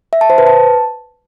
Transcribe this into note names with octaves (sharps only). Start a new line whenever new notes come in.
E5
A5
C5
B4
A5